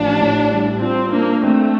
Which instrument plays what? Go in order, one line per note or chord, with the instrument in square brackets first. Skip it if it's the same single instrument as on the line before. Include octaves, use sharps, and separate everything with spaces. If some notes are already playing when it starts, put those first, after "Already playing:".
Already playing: [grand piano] A1 F3 [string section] D4
[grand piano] A2
G3
[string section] C4 [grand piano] F4
[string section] A#3 [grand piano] D4
[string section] A3 [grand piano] C4